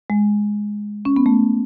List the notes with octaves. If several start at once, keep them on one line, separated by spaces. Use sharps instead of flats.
G#3
C#4
B3
A3